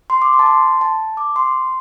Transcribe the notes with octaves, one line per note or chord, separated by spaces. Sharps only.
C6
D6
C6
A5
C6
A5
D6
C6